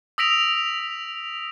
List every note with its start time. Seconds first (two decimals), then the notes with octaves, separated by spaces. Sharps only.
0.18 D#6 E6 A#6 B6 D7 F7